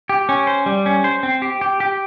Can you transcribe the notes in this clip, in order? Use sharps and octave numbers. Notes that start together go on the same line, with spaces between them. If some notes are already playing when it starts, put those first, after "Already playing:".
G4
C#4
C5
G3
C#4
C5
C4
G4
G4
G4